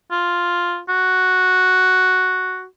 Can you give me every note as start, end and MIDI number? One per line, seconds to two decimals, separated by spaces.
0.11 0.79 65
0.89 2.65 66